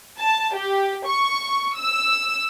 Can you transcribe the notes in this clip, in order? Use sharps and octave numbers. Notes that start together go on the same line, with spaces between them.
A5
G4
C#6
E6